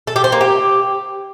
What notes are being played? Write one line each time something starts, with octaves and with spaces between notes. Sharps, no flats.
A4
G4
C5
A#3
G4